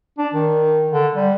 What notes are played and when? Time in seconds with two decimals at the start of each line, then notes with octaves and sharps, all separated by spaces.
0.18 D4
0.33 D#3
0.91 D3
1.15 G3